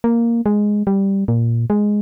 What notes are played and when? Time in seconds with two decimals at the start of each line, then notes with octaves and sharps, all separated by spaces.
0.04 A#3
0.46 G#3
0.87 G3
1.28 A#2
1.70 G#3